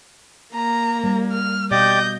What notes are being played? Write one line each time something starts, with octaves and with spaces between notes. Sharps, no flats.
A#3 A#5
G3
F6
B2 G4 D5 D#5 F5 D6 G6